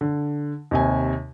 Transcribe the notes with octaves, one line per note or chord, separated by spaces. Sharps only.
D3
D#2 C3 G#5